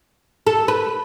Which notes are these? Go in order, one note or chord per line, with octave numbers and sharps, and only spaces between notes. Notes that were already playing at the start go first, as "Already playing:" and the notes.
A4
B4